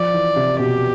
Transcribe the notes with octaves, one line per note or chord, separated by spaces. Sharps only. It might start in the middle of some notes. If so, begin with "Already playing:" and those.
Already playing: F3 D5
E3
C3
B2 G4